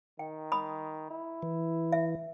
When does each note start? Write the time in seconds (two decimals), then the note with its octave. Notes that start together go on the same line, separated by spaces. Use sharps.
0.19 D#3 G5
0.52 B5 D#6
1.11 E4
1.43 E3
1.93 E5